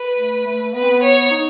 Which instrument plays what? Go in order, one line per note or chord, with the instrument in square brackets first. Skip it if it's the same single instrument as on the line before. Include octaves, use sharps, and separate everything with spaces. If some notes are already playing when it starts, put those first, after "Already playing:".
Already playing: [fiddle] B4
[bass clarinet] A3
A3
[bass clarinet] B3 [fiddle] B4
[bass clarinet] C4
B3
[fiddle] C#5
[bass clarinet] D#4